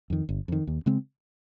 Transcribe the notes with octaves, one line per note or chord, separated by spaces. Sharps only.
F2 D#3
G1
F2 D#3
D#2
C#3 G#3 C4